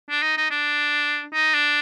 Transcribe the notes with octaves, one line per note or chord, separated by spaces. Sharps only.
D4
D#4
D#4
D4
D#4
D4